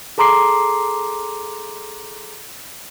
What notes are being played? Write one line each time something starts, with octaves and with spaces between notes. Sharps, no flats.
G#4 A4 A#5 C6 D6 C7